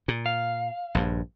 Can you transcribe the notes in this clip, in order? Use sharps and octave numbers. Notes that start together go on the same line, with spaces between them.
A#2
F5
A#1 G2